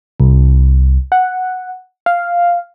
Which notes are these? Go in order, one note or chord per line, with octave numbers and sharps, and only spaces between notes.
C2
F#5
F5